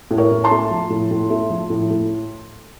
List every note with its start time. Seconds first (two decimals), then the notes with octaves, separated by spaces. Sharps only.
0.11 A2
0.18 A#4 C#5
0.31 A2
0.44 A5 C6
0.51 A3
0.71 F3
0.90 A2
1.11 A2
1.30 A3
1.50 F3
1.70 A2
1.90 A2